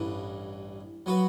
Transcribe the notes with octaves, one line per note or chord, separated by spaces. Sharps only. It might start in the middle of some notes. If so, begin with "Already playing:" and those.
Already playing: A1 G2 E3
F#3 B3 F#4 B4